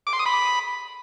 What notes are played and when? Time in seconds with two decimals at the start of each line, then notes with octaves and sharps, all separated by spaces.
0.07 D6
0.13 C6
0.19 D#6
0.26 B5